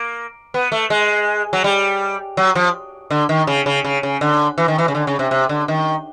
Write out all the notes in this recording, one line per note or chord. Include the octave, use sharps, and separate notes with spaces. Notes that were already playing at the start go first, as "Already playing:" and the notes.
Already playing: A#3
B3
A3
G#3
F#3
G3
F#3
F3
D3
D#3
C#3
C#3
C#3
C#3
D3
E3
D#3
E3
C#3
D3
C#3
C3
C3
D3
D#3